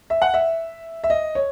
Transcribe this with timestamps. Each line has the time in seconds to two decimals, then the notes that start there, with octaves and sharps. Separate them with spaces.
0.10 E5
0.22 F#5
0.34 E5
1.04 E5
1.10 D#5
1.35 C#5